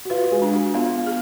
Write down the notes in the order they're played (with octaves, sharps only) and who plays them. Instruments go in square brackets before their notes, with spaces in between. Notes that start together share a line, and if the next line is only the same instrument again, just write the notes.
[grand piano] F#4
[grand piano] F4 [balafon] B4
[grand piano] F#4
G#3 G#4
[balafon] D4
[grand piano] F#4
[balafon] B3 [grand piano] F4
[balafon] G#4